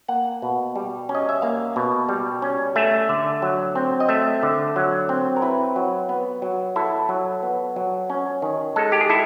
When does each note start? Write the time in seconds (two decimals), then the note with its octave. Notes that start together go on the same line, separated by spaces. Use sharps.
0.08 A#3 F#5
0.42 B2
0.76 G3
1.09 C#4
1.15 D#5
1.29 E5
1.42 A#3 F5
1.76 B2
2.09 G3
2.42 C#4
2.76 A3 E5
3.09 D3
3.42 F#3
3.75 C4
4.00 D#5
4.09 A3 E5
4.43 D3
4.76 F#3
5.09 C4
5.36 A#4
5.42 E4 B4
5.76 F#3
6.09 B3
6.42 F#3
6.76 E4 A4
7.09 F#3
7.43 B3
7.76 F#3
8.10 C#4
8.42 D#3
8.76 G#3 A4
8.92 G4
9.01 G#4
9.10 E4 A4